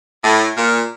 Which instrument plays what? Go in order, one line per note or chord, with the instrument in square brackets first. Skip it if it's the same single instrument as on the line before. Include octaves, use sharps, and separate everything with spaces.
[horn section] A2
A#2